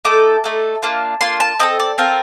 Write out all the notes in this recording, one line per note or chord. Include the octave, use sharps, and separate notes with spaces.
A3 D#4 A4 D6
A3 D#4 A4
A#3 D4 F4
A#3 D4 F4 C6
A5
C4 F4 A4 D#5
D5
C4 F4 A4 A#4